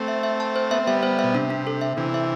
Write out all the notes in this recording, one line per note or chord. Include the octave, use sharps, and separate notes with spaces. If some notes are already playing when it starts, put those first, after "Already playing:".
Already playing: A3 C4
E5
E5
A5
C5
B3 E5
C4
G3 B3 E5
C5
B2 E5
C3 D4
D4
A4
E5
C3 E3 D4
E5